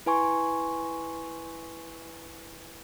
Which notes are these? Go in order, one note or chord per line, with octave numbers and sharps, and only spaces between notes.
E4 B4 G#5 C6 C#6